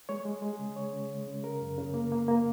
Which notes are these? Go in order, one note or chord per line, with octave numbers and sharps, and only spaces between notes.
G#3 C#5
G#3
G#3
G#4
C#3
C#3 C#5
C#3
G#3
C#3
C#3 A#4
F#2
C#3
A#3
A#3
A#3